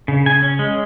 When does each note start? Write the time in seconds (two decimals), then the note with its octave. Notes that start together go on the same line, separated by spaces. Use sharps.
0.08 C#3
0.26 C#3 G#5
0.42 C#4
0.59 G#3